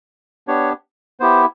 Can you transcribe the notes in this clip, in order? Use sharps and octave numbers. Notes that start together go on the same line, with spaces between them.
B3 D4 G4 C#5
B3 E4 G4 C5